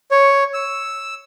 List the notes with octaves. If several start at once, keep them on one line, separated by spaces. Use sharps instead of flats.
C#5
E6